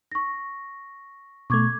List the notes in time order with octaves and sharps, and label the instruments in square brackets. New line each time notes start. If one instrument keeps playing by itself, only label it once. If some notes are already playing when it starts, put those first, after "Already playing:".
[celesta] C#6 A#6
[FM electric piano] B2 A3 [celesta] C#6 D6 G#6